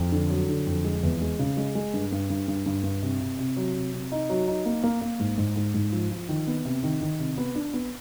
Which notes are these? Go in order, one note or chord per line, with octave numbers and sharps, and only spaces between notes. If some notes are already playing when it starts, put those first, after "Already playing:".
Already playing: F2
D3
F#3
D3
F2
G#3
E2
G#3
C#3
G#3
G#3
G2
G2
G2
G2
G2
G2
C3
C3
C3
F#3
C3
C3
D#4
F#3
D#4
A#3
A#3
A#3
G#2
G#2
G#2
G#2
F3
F3
D#3
B3
C3
D#3
D#3
C3
B3
D4
B3